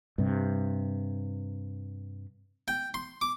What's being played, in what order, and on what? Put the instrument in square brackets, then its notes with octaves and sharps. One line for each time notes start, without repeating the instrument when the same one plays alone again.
[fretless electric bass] G2 C3
[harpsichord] G5
C6
D6